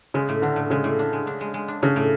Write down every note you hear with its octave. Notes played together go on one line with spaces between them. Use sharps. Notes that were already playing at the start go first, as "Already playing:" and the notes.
C#3 G#3
A2
D3 D4
A2
C#3 G#3
A2
D4
G#3
D4
G#3
G#3
D4
C#3 D4
A2